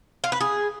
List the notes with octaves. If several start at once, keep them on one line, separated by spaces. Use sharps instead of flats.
F4
B4
G#4